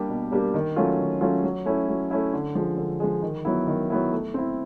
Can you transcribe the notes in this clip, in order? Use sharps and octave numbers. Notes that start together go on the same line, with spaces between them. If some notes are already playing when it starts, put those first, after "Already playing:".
Already playing: G3 A#3 D4 G4
B2
G3 A#3 D4 G4
D#3
F#3 A3 C#4 F4
D#3
F#3 A3 C#4 F4
F#3
A3 C#4 E4
F#3
A3 C#4 E4
D3
F3 G#3
D3
F3 G#3
D#3
F#3 B3 E4
D#3
F#3 B3 E4
A3
C4 E4